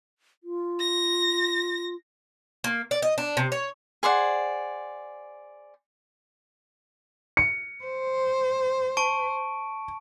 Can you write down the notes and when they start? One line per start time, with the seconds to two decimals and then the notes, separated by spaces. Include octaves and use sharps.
0.44 F4
0.80 A#6
2.64 A#3
2.91 D5
3.02 D#5
3.18 D4
3.37 C3
3.52 C#5
4.03 G#4 C5 D5 F#5
7.37 C#7
7.85 C5
8.97 A5 C#6 D7